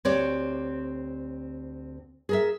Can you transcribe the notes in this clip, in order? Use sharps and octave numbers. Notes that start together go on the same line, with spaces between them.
D2 C4 G4 C#5 D5
G#4 A#4 E5